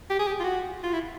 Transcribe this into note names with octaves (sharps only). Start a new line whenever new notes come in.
G4
G#4
G4
F4
F#4
F4
E4